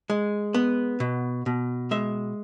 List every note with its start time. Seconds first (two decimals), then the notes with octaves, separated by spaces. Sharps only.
0.10 G#3
0.54 B3
1.00 B2
1.46 B2
1.91 G#3 E5